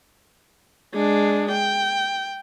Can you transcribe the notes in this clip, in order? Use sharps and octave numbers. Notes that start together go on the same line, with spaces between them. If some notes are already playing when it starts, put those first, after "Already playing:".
G#3 D4
G5